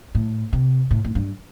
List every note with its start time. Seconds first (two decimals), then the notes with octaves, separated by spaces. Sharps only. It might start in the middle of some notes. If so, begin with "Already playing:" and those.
0.15 A2
0.53 C3
0.91 A2
1.05 A2
1.15 G2